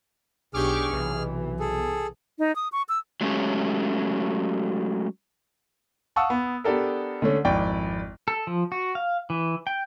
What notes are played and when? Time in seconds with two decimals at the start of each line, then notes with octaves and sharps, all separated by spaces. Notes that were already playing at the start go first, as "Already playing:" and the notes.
0.54 B1 D4 G4 G#4 C#6 D6 F6
0.92 B1 C3 E3
1.59 G#4 A4
2.39 D#4
2.56 D#6
2.72 C#6
2.89 E6
3.21 F#3 G#3 A3 C#4 G4
6.16 F5 F#5 A5 C#6 D#6 E6
6.30 B3
6.64 B3 D4 G4 A4 A#4
7.22 D3 A3 C#4
7.45 G#1 F2 E4 D5 G5
8.28 A4
8.47 F3
8.72 F#4
8.95 F5
9.30 E3
9.67 G5